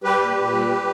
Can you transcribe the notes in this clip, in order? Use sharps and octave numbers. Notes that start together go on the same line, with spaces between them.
G3 G4 B4
A#2
A#2
G3
G3